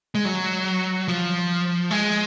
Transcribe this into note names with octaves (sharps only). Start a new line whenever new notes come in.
G#3
F#3
F3
G#3